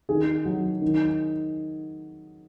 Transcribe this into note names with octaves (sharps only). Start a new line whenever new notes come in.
D#3 G#4
F#3
D#3